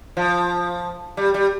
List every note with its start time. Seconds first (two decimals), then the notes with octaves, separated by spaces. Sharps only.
0.17 F3
1.17 G3
1.34 G3